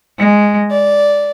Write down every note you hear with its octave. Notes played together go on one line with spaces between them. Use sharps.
G#3
D5